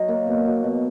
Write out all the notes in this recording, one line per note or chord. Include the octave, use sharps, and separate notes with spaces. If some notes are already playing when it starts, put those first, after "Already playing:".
Already playing: F#3 D#5
A#3
B2
B2
B2